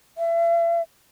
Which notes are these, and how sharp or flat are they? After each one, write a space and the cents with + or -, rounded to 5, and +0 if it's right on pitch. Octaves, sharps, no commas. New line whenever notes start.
E5 +40